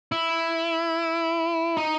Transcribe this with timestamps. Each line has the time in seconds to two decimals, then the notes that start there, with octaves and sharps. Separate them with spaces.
0.12 E4
1.77 D#4